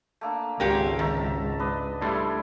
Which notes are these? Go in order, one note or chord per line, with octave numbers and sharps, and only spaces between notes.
A3 A#3 D4
G#1 C#2 F#3 F4 G4 A#4 F#5 G#5
D#3 E5 A5 A#5
D4 B4 D#5
G3 A3 D4 E4 C6